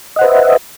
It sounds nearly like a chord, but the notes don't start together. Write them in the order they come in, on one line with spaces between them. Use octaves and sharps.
D#5 F#5 C5 B4 E5